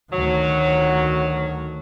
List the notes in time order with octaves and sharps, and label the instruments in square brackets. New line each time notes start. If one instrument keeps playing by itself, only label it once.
[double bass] D2 D#3 [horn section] F#3